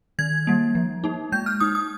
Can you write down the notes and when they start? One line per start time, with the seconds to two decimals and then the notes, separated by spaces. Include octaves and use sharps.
0.19 D#3 G#6
0.47 G3 A#3
0.75 F3
1.04 A#3 D#4
1.32 G#3 G6
1.46 F6
1.60 D#4 D#6
1.75 D#6